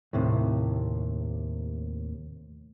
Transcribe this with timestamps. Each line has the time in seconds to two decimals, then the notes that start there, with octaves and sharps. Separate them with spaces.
0.13 D#2 A2 C3